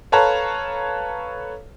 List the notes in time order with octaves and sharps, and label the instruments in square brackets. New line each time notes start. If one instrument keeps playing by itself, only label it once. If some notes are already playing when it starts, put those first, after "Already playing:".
[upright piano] A4 B4 C#5 F5 A5 A#5